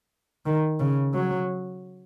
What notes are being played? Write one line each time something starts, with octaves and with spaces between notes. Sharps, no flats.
D#3
C#3
F#3